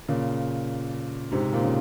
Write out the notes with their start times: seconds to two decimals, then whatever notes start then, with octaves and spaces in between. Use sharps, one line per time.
0.09 A#2 C#3
1.32 G#2 C3
1.53 A#2
1.64 C#3